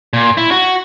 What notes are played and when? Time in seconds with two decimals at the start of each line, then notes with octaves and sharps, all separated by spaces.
0.13 A#2
0.37 E4
0.51 F#4